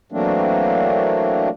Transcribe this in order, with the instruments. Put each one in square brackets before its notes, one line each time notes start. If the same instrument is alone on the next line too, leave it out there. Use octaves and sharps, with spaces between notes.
[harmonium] E3 F#3 A3 A#3 C4 D4